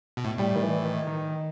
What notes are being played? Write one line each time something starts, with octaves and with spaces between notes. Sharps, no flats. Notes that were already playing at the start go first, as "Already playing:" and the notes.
B2
A2
A2 G3
D#3
E3
D#3
D#3